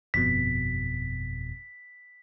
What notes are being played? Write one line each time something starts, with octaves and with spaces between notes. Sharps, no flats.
G1 F2 B2 B6